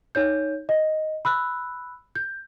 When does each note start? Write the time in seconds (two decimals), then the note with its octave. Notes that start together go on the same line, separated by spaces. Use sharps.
0.15 D#4 C#5 G6
0.69 D#5
1.25 B5 E6 F#6
2.15 G6